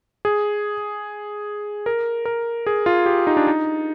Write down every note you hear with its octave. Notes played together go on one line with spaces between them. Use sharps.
G#4
A#4
A#4
G#4
F4
G4
D#4
D4
D#4